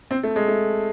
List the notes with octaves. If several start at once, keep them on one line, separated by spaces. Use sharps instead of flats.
C4
A3
G#3
A3